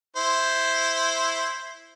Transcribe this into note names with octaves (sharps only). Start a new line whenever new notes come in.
E4 C5